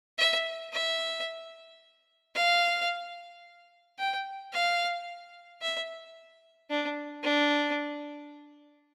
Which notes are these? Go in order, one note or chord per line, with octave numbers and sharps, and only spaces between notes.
E5
E5
F5
G5
F5
E5
D4
D4